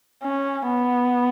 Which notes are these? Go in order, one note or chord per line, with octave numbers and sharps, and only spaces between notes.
C#4
B3